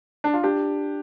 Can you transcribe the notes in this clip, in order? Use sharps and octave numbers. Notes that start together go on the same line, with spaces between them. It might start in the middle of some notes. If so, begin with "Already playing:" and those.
D4
F4
D4 G4